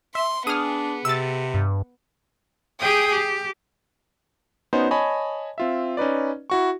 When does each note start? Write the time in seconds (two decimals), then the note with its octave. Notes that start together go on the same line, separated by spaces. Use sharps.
0.15 E5 C6
0.47 B3 D4 G#4 D#6 F6
1.05 C3 E6 A6
1.54 G2
2.79 G4 G#4 G5 G#5 D#6
3.10 G4
4.73 B3 C#4 D#4 F#4 C5
4.91 C#5 D#5 G#5 A5 B5
5.58 C4 F4 E5
5.97 C#4 D#4 B4 D5
6.50 E4 F#4 C#6